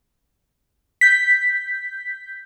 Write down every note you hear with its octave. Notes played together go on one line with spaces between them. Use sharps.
G6 B6